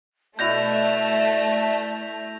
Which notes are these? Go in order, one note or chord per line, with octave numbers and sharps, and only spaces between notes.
B2 A3 E4 D5 G6 A#6 F7